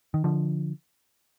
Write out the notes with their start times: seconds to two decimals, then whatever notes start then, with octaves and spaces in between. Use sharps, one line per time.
0.14 D#3
0.24 D3 F3